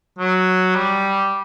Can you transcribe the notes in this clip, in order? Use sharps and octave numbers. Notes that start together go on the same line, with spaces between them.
F#3
G3